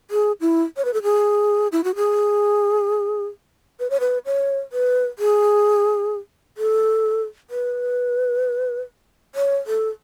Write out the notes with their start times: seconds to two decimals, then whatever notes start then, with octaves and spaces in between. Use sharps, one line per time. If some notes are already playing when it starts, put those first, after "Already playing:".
0.11 G#4
0.41 E4
0.77 C#5
0.85 B4
0.94 A4
1.03 G#4
1.72 E4
1.84 F#4
1.96 G#4
3.80 B4
3.90 C#5
4.00 B4
4.26 C#5
4.72 B4
5.19 G#4
6.58 A4
7.50 B4
9.35 C#5
9.67 A4